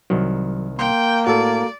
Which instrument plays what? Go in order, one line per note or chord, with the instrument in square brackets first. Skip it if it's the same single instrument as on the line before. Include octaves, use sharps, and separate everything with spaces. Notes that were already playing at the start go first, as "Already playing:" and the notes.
[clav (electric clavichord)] C2 D#3 [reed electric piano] F#3
[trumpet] A#3 [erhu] G5 [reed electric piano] C6 G6
[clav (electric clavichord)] A2 [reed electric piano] F#4 A4 [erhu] D5